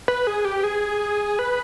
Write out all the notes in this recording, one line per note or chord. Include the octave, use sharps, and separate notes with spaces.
B4
G#4
G4
G#4
B4